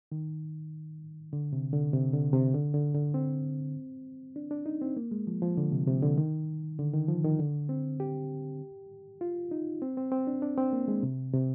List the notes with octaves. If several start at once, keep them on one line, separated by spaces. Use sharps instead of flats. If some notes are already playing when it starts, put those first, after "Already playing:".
D#3
D3
C3
D3
C3
D3
C3
D3
D3
D3
C4
D4
D4
D#4
C4
A#3
G#3
F3
F3
D3
C3
C3
D3
D#3
D3
D#3
F3
D#3
D3
C4
G4
F4
D#4
C4
C4
C4
D4
D4
C4
A#3
G#3
C3
C3